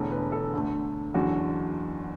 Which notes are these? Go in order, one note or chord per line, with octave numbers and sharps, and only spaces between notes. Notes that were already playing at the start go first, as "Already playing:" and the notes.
Already playing: E1 E2 D3 A3
B4
A4
D2 D3 A3
F#1 E2 D3 F#3 F#4